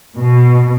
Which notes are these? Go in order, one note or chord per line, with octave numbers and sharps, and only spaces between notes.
B2